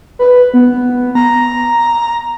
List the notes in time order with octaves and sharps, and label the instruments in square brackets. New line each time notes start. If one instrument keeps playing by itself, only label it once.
[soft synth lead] B4
B3
A#5